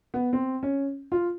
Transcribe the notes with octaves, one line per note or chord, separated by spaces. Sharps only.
B3
C4
C#4
F4